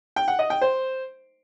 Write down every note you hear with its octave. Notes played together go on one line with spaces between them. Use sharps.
G5
F#5
D#5
G5
C5